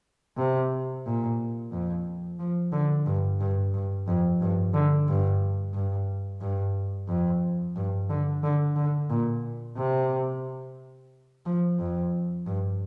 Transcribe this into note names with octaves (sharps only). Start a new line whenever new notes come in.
C3
A#2
F2
F3
D3
G2
G2
G2
F2
G2
D3
G2
G2
G2
F2
G2
D3
D3
D3
A#2
C3
F3
F2
G2